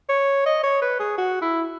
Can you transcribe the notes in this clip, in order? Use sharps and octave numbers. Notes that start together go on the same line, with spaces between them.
C#5
D#5
C#5
B4
G#4
F#4
E4